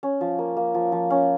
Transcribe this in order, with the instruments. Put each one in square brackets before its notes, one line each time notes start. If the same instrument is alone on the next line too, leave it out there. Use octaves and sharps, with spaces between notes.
[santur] C#4
F3
A#3
A#3
F3
F3
C#4